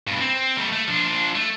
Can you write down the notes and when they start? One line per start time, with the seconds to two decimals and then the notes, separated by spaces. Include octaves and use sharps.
0.07 G2 B2
0.20 C4
0.58 G3 A3
0.72 A3
0.88 F3 D4
1.36 A3